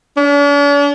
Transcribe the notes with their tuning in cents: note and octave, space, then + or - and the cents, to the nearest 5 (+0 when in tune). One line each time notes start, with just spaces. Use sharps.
D4 -45